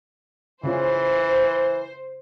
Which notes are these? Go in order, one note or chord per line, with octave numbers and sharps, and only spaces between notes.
C#3 E3 C#4 F4 C5